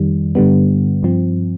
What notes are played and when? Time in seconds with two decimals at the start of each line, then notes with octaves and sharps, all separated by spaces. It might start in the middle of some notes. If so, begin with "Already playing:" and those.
Already playing: F2 D#3 G3
0.35 G2 D3 G3 B3
1.03 G2 F3 C4